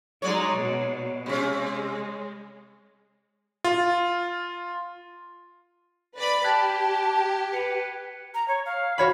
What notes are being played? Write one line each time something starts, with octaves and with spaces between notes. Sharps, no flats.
F#3 G#3 D#4 C#5 D5
B2
C3 G#3 C#4
F4
B4 D5 B5
G4 A5 F#6 G#6 B6
G#6
B4 B6 C#7 F7
A#5
C#5
F5
F#4 C#5 B5